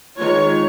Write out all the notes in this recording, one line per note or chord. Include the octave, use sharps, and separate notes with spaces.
D#3 G#3 F4 C#5